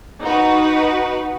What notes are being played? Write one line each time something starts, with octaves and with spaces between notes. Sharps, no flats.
D#4 F#4 B4